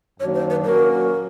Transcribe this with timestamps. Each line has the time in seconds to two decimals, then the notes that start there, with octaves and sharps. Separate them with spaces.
0.20 F#2 D#3 F#3 A#3 D4 C#5
0.35 C5
0.50 B4
0.65 A#2 F#3 A#3 C#4 F#4 A#4